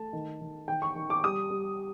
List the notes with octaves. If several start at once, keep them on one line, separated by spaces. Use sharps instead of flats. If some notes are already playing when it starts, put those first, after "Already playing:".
Already playing: A3 A5
D#3
D#3
D#3 G5
C#6
D#3
D6
G3 D#6
G3